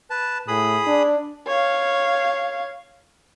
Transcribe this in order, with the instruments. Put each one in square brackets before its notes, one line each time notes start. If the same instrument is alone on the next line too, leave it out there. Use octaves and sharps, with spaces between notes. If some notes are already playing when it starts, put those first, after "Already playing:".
[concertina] B4 A5
[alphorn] A2 [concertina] G#4 B5 D#6
[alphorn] D4
[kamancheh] C#5 F5